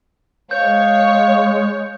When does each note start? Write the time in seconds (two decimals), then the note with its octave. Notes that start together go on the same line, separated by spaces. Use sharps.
0.51 G#3 C#5 F5 G6